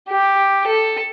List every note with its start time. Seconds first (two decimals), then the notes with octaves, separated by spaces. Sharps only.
0.09 G4
0.67 A4